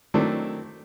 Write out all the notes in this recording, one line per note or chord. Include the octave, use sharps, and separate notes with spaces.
D#3 F#3 A3 C4 D4 E4